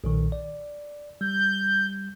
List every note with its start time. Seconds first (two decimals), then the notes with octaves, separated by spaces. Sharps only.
0.04 B1 A#2 D#3
0.32 D5
1.21 G3 G6